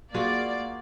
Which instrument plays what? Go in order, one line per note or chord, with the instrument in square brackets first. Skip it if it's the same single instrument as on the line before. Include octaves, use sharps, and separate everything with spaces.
[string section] A#3 D5 [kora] F4 F#4 G#4